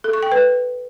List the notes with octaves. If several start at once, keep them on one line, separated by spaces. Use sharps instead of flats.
A4
C#6
G5
B4